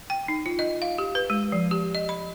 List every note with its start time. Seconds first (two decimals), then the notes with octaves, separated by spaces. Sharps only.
0.10 G5
0.28 D#4
0.46 F4
0.59 D#5
0.82 F5
0.98 G4
1.15 B4
1.30 G#3
1.52 F3
1.71 G4
1.95 D#5
2.09 B5